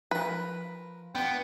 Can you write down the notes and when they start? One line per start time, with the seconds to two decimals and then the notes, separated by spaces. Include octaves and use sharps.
0.11 F3 A#4 B4
1.15 B3 D4 F4 G5